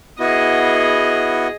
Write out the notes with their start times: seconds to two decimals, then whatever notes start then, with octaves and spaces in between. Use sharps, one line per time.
0.20 B3 E4 F#4 G#4 D#5